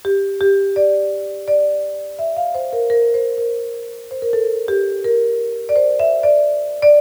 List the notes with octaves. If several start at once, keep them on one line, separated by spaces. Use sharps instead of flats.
G4
G4
D5
D5
E5
F5
C5
A#4
A#4
C5
A#4
C5
A#4
A4
G4
A#4
D5
C5
E5
D5
D5